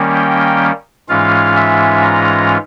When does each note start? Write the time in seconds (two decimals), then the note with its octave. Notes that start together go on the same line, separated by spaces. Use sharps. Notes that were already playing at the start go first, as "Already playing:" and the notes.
Already playing: D#3 G3 A#3 C#4
0.15 G5
1.09 G#2 E3 G#3 C#4 F4 F5
1.55 E5
2.02 A#5